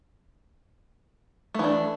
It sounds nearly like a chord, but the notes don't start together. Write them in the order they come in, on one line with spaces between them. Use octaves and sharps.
A3 E3 D4